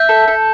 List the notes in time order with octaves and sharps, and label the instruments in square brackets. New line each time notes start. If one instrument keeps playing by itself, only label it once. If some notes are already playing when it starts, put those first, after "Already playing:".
Already playing: [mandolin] E5 [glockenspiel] G6
[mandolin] A4
A4